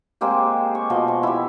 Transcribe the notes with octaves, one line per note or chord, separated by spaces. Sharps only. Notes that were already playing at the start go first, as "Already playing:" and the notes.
G#3 A#3 C4 G4
C#6
B2 F3 D#5
C#6
E4 G4